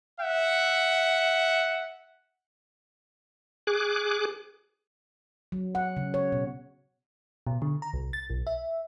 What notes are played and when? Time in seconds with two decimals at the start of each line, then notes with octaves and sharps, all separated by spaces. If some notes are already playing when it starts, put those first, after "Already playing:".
0.20 E5 F#5
3.67 G#4 D6 F#6
5.52 F#3
5.75 F#5
5.97 C#3
6.14 C#5
6.32 B2
7.47 B2
7.62 D3
7.82 A#5
7.93 C2
8.13 A6
8.30 B1
8.47 E5